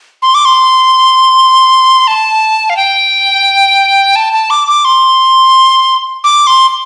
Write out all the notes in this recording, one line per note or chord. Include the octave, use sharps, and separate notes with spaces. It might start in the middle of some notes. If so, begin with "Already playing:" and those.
C6
D6
C6
A5
F5
G5
A5
A5
D6
D6
C6
D6
C6